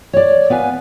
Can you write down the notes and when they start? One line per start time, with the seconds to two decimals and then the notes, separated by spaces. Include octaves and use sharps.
0.13 C#5 D5
0.50 B3 B4 F5 G#5